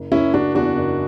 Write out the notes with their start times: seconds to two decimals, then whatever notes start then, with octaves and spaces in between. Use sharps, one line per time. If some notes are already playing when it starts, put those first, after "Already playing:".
Already playing: F#1
0.11 F#1 C#4 E4
0.33 F#1 D4 F#4
0.55 E2 D4 F#4
0.77 F#1